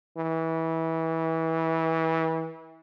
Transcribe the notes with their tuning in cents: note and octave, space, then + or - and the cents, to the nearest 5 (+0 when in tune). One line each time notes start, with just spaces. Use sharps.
E3 -25